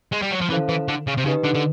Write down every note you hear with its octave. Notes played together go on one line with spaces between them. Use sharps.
G#3
G3
F#3
F3
E3 C#4 E4 A4 C5 F5
E3
D3
C#3
C3
C#3 D#4 G4 B4 D#5
D3
D3